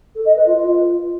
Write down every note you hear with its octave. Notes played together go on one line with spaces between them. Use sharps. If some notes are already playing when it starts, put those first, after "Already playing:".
A4
D#5
B4
F4
F4